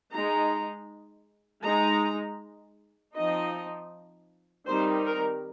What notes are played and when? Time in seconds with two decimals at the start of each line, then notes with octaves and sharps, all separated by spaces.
0.12 G#3 D#4 A#5
1.63 G#3 D#4 A#5
3.15 F3 C4 D#4 D#5
4.67 D#3 G3 C4 D#4 C5
5.05 A#4